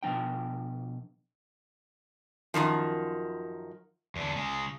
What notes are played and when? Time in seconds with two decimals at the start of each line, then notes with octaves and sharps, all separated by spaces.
0.03 B2 F3 D4 G5
2.54 F#2 A#2 D#3 F3
4.16 E2 D3
4.36 C#3 G#3